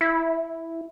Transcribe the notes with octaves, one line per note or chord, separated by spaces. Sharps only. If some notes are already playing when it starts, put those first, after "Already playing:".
E4